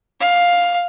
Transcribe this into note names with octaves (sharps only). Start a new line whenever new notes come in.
F5